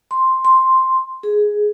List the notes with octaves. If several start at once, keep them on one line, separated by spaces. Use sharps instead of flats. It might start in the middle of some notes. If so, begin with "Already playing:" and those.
C6
C6
G#4